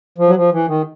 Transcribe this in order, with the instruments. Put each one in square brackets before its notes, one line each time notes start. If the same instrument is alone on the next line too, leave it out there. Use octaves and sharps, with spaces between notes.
[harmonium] F3
F#3
F3
E3
D#3